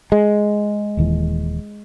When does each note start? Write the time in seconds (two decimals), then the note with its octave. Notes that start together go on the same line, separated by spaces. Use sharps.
0.12 G#3
0.97 D#1 D#2 E3